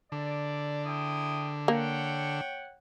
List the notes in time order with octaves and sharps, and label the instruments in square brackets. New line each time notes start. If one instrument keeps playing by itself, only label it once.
[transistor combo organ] D3 [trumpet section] D5
[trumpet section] E4 G5 D#6
[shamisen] A#3 [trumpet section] C#5 F#5 G5